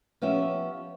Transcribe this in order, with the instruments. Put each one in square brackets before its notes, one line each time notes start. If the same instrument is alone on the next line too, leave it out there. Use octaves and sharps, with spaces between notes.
[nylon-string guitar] F3 B3 C#4 G4 E5